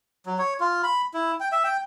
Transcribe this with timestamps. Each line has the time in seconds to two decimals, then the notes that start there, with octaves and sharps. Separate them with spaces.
0.26 F#3
0.39 C#5
0.60 F4
0.83 B5
1.14 E4
1.40 G5
1.52 E5
1.64 G5